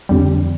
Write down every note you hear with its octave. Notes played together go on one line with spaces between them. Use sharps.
F2 D3 G3